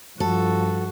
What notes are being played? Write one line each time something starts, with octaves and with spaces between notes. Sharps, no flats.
G2 F3 F#4 A4